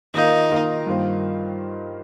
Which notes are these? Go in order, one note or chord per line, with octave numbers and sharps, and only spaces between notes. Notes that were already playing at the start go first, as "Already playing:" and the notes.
D#3 A#3 D#4 F4 A#4 F5
D#3 A#3 F4 A#4 F5
G2 D#3 A#3 F4 C5